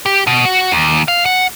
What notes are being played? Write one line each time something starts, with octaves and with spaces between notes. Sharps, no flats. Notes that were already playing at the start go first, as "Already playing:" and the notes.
G4
B2
F#4
D#2
F5
F#5